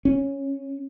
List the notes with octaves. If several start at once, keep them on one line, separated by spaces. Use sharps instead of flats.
C#4